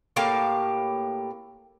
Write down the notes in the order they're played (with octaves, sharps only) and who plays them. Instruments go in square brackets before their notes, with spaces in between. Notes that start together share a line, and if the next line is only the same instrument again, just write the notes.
[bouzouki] A2 A#3 G4 F5